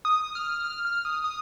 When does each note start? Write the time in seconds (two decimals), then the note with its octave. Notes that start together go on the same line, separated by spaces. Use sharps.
0.05 D#6
0.35 F6
0.64 F6
0.85 F6
1.05 D#6
1.24 D#6